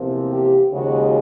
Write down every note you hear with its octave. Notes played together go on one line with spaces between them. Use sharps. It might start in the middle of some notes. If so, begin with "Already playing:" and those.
Already playing: E2 C3 F3 A#3
G4
D#2 C#3 F3 G#3 F#4